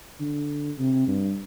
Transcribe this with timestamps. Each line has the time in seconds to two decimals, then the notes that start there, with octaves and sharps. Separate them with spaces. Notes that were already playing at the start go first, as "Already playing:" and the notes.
0.20 D3
0.79 C3
1.08 G2